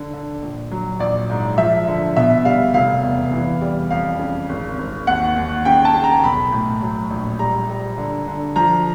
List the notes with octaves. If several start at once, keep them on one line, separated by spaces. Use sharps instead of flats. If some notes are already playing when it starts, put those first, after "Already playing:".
Already playing: D3
D3
A#1
F#3
A#1 D5
G#2
F3 E5
D3
B2 E5
G3 F5
F1 F5
E2
E3
G3
F2 F5
C#3
G#1
G#1
D#2 F#5
D#2
C#3 G5
A5
C#3
A#5
B1 B5
A2
F#3
A#1
G3 A#5
G3
D3
D3
F3 A#5